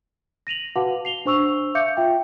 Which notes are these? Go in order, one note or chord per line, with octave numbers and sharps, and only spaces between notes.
A#6 D#7 F7 F#7
F#4 B4 F5 F#5 A5 D6
C7 F7 G7
D4 C5 C#6 E6 F7
E5 F5 D6 G6 C#7
F4 E5 G5